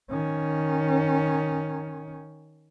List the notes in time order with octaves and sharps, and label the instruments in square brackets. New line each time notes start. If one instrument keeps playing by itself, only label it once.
[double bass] D#3 C#4